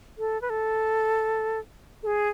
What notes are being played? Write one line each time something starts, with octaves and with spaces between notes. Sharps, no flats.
A4
B4
A4
A4
G#4